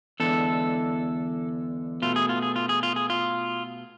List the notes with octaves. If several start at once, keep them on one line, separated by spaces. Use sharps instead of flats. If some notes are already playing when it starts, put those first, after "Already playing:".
E2 D3 G#3 A4
B2 A3 F4
G#4
F4
G#4
F4
G#4
F4
G#4
F4